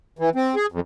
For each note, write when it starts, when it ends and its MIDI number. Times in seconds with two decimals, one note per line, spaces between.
0.19 0.30 52
0.35 0.55 60
0.55 0.66 68
0.72 0.80 41